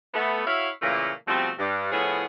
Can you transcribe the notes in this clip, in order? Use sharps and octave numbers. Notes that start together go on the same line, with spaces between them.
A3 B3
E4 F#4 C#5 E5 F5
A#2 C#3 E3 A3 A#3
B2 F3 G3 A3 C4
G2
A2 F3 B3 C#4 E4 G#4